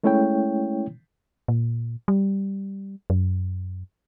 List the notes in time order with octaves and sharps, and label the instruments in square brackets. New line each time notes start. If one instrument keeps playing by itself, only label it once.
[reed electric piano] G#3 A3 C#4 E4 C#5 G5
[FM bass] A#2
G3
F#2